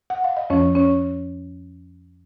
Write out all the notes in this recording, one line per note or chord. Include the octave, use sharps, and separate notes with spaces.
F#5
F5
D#5
F2 F3 C#4 C#5
C#4 C#5